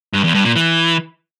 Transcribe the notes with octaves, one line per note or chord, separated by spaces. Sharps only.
G2
E2
G2
A#2
E3